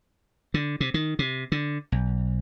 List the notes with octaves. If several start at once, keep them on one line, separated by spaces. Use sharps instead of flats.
D3
C3
D#3
C3
D3
B1